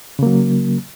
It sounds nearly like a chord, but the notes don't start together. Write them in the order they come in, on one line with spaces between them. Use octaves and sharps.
C#3 A#3 F#3